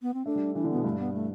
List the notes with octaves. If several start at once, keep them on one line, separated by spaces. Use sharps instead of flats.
B3
C4
A3 D4
G3
E3 D4
D3
B2 B3
G2 A3
B3
A3